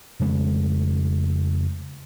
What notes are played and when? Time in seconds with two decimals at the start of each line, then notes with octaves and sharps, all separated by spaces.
0.20 F2 C#3 G#3 A3